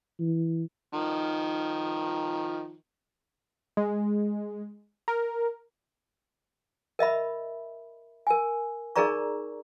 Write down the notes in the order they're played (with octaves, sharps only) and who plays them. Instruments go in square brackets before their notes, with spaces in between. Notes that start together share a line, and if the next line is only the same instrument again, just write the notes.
[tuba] E3
[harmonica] D#3 F3
[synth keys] G#3
A#4
[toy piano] A#4 D#5 E5 B5
A#4 G#5
D#4 G#4 A#4 D5 A#5 C#6